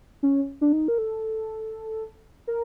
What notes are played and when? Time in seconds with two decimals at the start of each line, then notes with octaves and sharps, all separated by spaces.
0.23 C#4
0.61 D4
0.72 D#4
0.88 A#4
0.98 A4
2.47 A#4